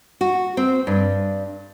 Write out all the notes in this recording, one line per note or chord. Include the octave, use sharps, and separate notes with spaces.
F#4
C4
G2